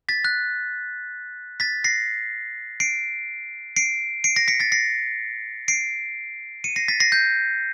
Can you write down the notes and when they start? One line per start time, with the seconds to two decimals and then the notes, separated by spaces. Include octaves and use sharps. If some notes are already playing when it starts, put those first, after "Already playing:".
0.09 A6 B6
0.25 F#6
1.60 A6 B6
1.84 A#6 C7
2.80 C7 D7
3.76 C7 D7
4.24 C7 D7
4.36 A#6 C7
4.48 B6 C#7
4.60 A6 B6
4.72 A#6 C7
5.68 C7 D7
6.64 C#7 D#7
6.76 A#6 C7
6.88 A6 B6
7.00 A#6 C7
7.12 G6